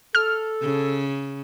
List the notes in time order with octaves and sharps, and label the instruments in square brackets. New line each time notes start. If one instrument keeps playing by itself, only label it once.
[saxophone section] A4 [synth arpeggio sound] F6
[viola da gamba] C#3